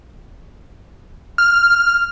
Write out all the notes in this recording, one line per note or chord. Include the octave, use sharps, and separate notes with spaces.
F6